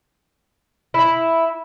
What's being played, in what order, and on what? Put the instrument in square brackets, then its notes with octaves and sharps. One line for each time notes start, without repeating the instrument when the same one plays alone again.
[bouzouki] E4